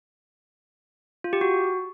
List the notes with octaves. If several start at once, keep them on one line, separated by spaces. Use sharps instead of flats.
F4
G4
F#4